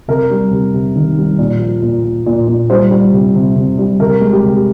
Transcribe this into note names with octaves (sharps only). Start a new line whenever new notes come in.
C3 A#4
G3
C3
C3
D#3
G3
A#2
F3
A#2
A#2
A#2
A#2
G3 C5
G3
C3
C3
C3
G3
C3 A#4
G#3
G4
C3